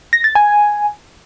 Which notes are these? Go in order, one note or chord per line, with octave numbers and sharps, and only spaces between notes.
A#6
A6
G#5